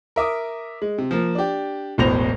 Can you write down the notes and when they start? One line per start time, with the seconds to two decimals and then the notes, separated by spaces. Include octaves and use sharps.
0.16 A#4 E5 D6 D#6
0.82 G#3
0.98 C3
1.11 F3 A#3
1.35 D4 G4
1.98 E1 A1 B2 C5 A#6 F7